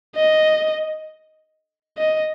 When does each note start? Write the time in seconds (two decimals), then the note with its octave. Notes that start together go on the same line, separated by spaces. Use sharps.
0.16 D#5
1.98 D#5